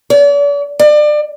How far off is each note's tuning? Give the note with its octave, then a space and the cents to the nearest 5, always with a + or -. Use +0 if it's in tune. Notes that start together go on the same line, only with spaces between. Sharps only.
D5 -40
D5 +30